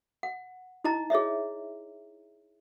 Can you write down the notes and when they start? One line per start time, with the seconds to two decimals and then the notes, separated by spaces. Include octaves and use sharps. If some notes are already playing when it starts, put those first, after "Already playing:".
0.23 F#5
0.84 D#4 E4 D#5 A#5
1.10 G#4 C#5 D#5 E5